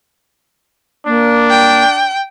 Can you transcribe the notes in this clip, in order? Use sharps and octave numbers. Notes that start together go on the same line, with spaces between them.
A#3 D4
G5